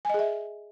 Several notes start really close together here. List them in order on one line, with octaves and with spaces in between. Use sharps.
G#5 D#5 G#4 E5